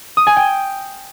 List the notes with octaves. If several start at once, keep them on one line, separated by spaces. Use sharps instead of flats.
D#6
G#5
G5